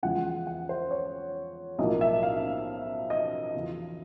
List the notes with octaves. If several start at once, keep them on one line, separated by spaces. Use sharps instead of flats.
E2 C#3 F3 G#3 F#5
F#5
C5
C#5
B1 A2 F3 A#3 D#5
E5
F5
D#5
E2 C#3 F3